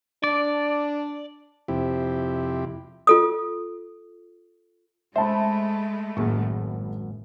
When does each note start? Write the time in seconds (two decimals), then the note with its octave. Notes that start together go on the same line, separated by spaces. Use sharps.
0.24 D4 D5
1.68 F2 C3 E4 G4
3.07 F4 A4 D#6
5.16 G#3 A3 C5 E5 A5 B5
6.17 G#1 F#2 A2 A#3 G#4